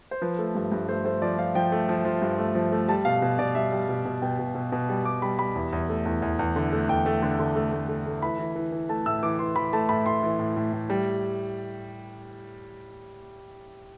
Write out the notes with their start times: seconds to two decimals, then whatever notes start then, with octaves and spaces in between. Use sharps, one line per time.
0.11 C5
0.21 F3 B4
0.38 A3
0.55 G2
0.72 G2
0.88 A3 C5
1.05 A3 C5
1.22 F3 D5
1.38 F3 F5
1.55 F3 G5
1.72 A3
1.89 F3
2.05 F3
2.22 G2
2.38 A3
2.55 F3
2.72 A3
2.88 G3 A5
3.05 B2 F5
3.22 B2
3.39 B2 D5
3.55 G3 E5
3.72 G3
3.89 B2
4.05 B2
4.22 B2 G5
4.39 B2
4.55 B2
4.72 B2
4.89 G3
5.05 G3 D6
5.22 G3 B5
5.39 G3 B5
5.55 E2
5.73 E2
5.89 A3
6.05 E2
6.22 E2
6.39 E2
6.56 D3
6.72 A3
6.89 E2 G5
7.06 A3
7.22 D3
7.39 D3
7.56 A3
7.72 A3
7.89 A3
8.06 A3
8.22 E3 B5
8.39 E3
8.56 E3
8.72 E3
8.89 A3 A5
9.06 A2 E6
9.23 E3 D6
9.39 E3 C6
9.56 E3 B5
9.73 A3 A5
9.89 A2 B5
10.06 A2 C6
10.23 E3
10.39 A2
10.56 A2
10.73 A2
10.90 G3